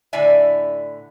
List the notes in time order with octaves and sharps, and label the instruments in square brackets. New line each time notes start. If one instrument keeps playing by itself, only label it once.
[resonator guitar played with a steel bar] A2 D3 E4 D5 E5 G#5